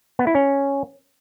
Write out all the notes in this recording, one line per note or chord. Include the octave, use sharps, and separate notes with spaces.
B3
E4
C#4